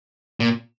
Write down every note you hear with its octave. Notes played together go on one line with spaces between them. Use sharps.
A#2